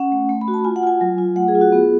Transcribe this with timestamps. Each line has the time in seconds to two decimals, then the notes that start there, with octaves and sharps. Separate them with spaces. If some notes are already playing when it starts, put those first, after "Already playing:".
Already playing: C#4 F#5
0.12 A3
0.29 A3
0.41 B5
0.48 F#4
0.54 A5
0.64 F4 G#5
0.76 F#5
0.83 F4 G#5
1.01 F#3
1.18 F4
1.36 A3 F#5
1.48 G#4
1.55 F4
1.61 F#4
1.72 B3 G#4